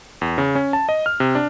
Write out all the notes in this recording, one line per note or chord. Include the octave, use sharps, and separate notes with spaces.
E2
C#3
C#4
A5
D#5
F6
C3
D4